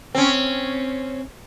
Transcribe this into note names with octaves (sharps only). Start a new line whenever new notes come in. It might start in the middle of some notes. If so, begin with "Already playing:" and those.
C4 C#4